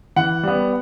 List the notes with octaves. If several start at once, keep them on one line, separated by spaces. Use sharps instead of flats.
E3 F#5
G3 B3